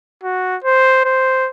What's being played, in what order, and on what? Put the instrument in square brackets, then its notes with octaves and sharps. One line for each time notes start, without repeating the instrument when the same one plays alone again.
[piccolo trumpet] F#4
C5
C5